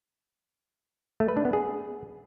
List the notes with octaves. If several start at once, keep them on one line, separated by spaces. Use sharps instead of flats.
A3
B4
D4
B3
G#4